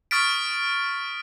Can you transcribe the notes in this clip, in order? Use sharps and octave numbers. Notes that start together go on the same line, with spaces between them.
C#6 D#6 F6 A6 B6 D7